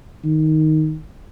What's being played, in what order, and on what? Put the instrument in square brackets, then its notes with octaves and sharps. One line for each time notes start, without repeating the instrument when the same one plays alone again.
[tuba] D#3